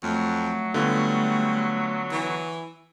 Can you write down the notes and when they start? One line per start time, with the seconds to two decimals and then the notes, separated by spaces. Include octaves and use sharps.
0.03 F2 F#3 A3
0.74 D3 G3 B3 F4
2.11 E3